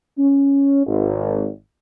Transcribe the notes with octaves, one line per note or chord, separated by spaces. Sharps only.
C#4
G#1